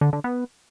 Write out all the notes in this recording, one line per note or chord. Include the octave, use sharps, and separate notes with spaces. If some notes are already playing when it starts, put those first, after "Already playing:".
D3
D3
B3